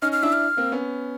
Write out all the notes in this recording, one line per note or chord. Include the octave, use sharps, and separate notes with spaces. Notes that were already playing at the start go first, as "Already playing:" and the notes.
C#4 D#4 F6
F6
D4 E4 E6
F6
A#3 C4
B3 C#4